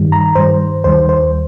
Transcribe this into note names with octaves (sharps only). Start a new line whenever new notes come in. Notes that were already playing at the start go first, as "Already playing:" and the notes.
Already playing: G2 D#3 G3
A#5
G2 D#3 G3 C5
D#2 D#3 G3 C5
C5